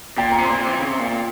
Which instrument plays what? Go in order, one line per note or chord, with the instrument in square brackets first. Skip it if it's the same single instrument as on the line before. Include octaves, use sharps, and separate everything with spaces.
[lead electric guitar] A#2 [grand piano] G5
[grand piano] A#5
[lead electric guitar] C3
[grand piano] C6
[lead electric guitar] A#2
C3
E3
C#3
C3
A#2